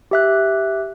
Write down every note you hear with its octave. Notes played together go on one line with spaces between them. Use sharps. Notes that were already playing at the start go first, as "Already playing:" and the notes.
G4 E5 F#6